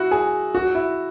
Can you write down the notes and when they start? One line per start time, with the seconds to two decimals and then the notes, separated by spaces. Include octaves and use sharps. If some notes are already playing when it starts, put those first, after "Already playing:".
Already playing: E4 F#4
0.11 G#4
0.55 F#4
0.75 E4